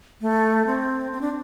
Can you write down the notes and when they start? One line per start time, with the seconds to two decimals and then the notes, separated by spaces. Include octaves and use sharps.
0.21 A3
0.67 C4
1.12 C4
1.21 D4